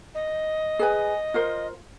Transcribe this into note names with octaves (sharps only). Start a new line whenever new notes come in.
D#5
G#4 B4 G#5
F4 A#4 C5